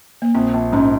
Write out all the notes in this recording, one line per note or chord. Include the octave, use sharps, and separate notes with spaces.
A#3
A#1 C4
A#1
G#2 C#4